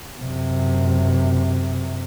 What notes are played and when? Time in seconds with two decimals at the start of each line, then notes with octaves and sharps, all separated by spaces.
0.20 F#2 C3